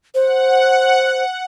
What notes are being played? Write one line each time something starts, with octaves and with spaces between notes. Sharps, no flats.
C5 F#5